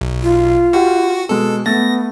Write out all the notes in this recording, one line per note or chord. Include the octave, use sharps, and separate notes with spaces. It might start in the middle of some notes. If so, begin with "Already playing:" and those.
B1
F4
F#4 G4 F#5
B2 G#3 A4
A3 B3 A6 A#6